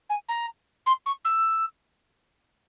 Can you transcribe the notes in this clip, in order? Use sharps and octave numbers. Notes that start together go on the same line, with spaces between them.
G#5
A#5
C6
C#6
E6